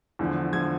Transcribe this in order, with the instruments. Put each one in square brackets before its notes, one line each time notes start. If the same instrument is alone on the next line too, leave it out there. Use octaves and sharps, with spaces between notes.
[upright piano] E2 D3 F3
D3 F3 G#6